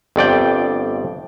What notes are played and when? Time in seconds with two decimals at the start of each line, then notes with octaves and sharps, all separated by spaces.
0.16 G1 F2 D5 G5